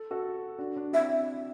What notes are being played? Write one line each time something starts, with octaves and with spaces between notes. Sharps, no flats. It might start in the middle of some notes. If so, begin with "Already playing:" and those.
Already playing: A4
F#4 A4
D4 F#4
D4 F#4
C4 E4 E5